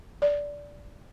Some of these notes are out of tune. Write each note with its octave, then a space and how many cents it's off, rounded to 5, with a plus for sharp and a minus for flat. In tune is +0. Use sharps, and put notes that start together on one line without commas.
D5 -15